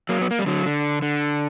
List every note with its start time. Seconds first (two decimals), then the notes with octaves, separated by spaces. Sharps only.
0.09 F#3 A#3
0.22 B3
0.31 A#3
0.39 G3
0.46 D3 F#3
0.66 D3
1.02 D3